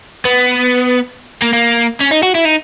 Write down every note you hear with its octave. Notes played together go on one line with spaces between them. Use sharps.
B3
A#3
A#3
C#4
D#4
F#4
E4
D#4